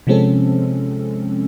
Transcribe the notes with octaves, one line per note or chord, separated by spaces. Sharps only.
C3 F3 G#3 C4 C#4 A4